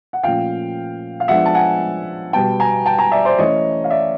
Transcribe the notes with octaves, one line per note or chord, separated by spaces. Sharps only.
F#5
A#2 F3 A3 C#4 F5 G5
F5
F3 G#3 B3 D4 E5 F#5
A5
F#5 G#5
B2 G3 B3 G5 A5
G#5 A#5
G5 A5
G#5 A#5
D5 E5
C5 D5
E3 A3 C#4 C#5 D#5
F5
D5 E5